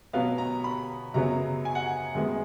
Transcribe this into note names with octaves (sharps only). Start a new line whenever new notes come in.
B2 F#3 B3 F5
A#5
B5
F#2 C#3 F#3 B3 A#5
G#5
F#5
G#5
F#2 D#3 G#3 B3